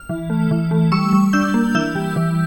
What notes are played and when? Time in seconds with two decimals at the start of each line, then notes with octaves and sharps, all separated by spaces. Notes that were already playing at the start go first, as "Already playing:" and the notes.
Already playing: F6
0.09 E3
0.30 A3
0.51 E3
0.71 A3
0.92 G3 C#6 E6
1.13 G3
1.33 D4 E6 G6
1.54 A#3
1.75 E3 E6 G6
1.95 G3
2.16 E3